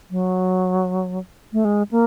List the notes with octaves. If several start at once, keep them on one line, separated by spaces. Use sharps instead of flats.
F#3
A3
G#3
A#3